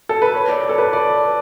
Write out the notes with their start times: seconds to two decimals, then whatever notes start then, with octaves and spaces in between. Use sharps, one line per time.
0.09 A4
0.22 B4
0.34 C#5
0.49 D5
0.69 A4
0.78 B4
0.93 D5